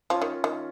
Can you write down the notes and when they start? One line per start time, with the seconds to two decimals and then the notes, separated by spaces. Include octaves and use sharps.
0.10 F3 C#4 F4
0.22 D#3
0.44 D#3